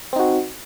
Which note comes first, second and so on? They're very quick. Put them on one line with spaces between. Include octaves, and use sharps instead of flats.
C4 D#4 F#4